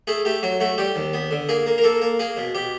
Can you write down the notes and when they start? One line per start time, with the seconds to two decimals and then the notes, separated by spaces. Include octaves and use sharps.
0.07 A3 G#4
0.25 A3 G4
0.43 F#3 F#4
0.60 A3 F#4
0.78 G3 G4
0.96 D#2
1.13 B3
1.31 D3
1.49 A#3 G#4
1.66 A#3
1.78 A#4
1.84 A#3 A4
2.02 A#3
2.19 A#3 G#4
2.37 B2
2.55 B2 G4